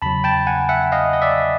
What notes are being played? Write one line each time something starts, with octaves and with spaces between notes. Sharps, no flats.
E2 C#3 F#3 A5 B5
G5 A5
F#5 G#5
E5 F#5
D#5 F5
D#5
D5 E5